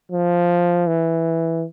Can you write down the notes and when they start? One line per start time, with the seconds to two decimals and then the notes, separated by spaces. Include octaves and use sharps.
0.12 F3
0.87 E3